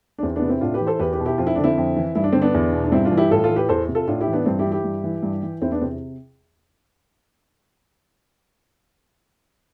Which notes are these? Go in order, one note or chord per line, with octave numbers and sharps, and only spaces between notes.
D4
E2 C4
B3 D4
C3
C4 E4
A2 D4 F4
G4 B4
E3
A4 C5
E2 G4 B4
G4 B4
B2
E4 G4
F2 F4
E4
D3 D4
C4 E4
F2
E3
G2 E4
D4
D3 C4
B3 D4
E2
B2
D4
G2 C4 E4
D4 F4
E3
E4 G4
A2 F4 A4
F4 A4
E3
G4 B4
E2 A4 C5
C3
F4 A4
A2 D4 F4
E4 G4
E3
B3 D4
G2 C4
E4 G4
E3
E4 G4
G2
E3
G2
E3
E2 C4 E4
B3 D4
C3 C4